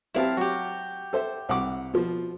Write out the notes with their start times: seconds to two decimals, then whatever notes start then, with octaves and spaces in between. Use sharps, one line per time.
0.14 F#3 C4 E4 G4 F5 A5
0.37 F#3 F#4 G4
1.13 A4 C5 E5
1.49 C2 F#5 D6
1.94 B2 F3